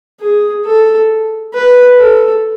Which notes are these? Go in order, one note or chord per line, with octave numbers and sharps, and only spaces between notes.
G#4
A4
B4
A4